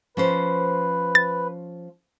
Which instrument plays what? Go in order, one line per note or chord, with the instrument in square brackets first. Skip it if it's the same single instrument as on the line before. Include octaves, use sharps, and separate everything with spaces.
[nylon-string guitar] F3 C#4 C5 [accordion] B4
[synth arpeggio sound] A6